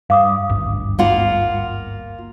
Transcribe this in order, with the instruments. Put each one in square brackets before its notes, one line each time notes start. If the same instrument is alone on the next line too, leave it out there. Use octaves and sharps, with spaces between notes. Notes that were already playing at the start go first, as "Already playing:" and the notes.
[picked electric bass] G2 [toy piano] F5 D6 D#6
[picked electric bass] G#1 D2 G2
[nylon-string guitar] A#3 F4 F#5